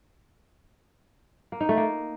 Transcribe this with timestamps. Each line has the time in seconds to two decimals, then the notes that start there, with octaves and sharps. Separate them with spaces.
1.52 A#3
1.61 D#4
1.69 A3
1.77 A#3